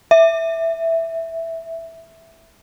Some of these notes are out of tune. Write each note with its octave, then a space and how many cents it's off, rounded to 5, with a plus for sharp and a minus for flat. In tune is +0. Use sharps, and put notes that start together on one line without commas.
E5 +0